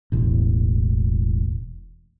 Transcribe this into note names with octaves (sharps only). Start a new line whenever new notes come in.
E1 A1